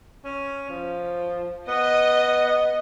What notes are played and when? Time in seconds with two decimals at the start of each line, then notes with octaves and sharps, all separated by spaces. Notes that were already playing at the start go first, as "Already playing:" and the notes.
0.25 C#4
0.70 F3
1.68 B3 D#5